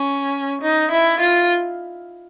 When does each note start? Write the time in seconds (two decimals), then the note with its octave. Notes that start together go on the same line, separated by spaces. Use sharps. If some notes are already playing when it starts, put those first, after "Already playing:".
Already playing: C#4
0.62 D#4
0.92 E4
1.20 F4